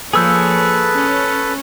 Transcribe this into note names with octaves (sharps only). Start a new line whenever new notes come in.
F3 A#3 G#4 A4 B4 C#5 E6 G6
C#4